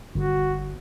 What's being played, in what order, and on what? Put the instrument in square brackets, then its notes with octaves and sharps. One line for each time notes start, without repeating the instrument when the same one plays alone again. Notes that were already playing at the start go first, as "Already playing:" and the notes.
[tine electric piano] G1 [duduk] F#4